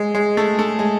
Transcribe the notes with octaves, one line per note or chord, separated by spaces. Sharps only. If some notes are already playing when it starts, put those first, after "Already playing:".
Already playing: G#3
G#3
A3
A3
G#3